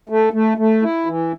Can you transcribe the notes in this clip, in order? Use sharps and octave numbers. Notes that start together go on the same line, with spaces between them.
A3
A3
A3
E4
E3